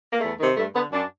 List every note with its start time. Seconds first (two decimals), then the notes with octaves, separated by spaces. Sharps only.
0.13 A#3
0.21 E2 A3
0.39 C3 D#3
0.56 G2 A3
0.74 D3 B3
0.92 F#2 D4